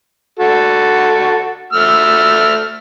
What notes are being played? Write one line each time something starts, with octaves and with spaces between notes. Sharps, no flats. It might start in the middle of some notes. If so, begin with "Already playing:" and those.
F#4 A4
A3 E6 F6